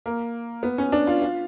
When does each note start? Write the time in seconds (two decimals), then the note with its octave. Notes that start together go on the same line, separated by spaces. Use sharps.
0.06 A#3
0.63 B3
0.78 C#4
0.92 D4
1.07 F4
1.22 F4